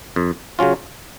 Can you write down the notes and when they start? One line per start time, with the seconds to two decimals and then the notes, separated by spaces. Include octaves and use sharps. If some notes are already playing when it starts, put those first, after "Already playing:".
0.16 F2
0.59 C#3 F#3 C#4 F4